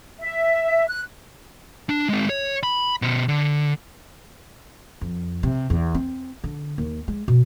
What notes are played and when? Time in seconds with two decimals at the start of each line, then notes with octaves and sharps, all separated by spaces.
0.20 E5
0.88 F#6
1.89 D4
2.09 G#3 C4
2.29 C#5
2.63 B5
3.02 B2 C5
3.28 D3
5.01 F2
5.43 C3
5.70 E2
5.95 C4
6.44 D3
6.78 D#2
7.08 G#3
7.28 B2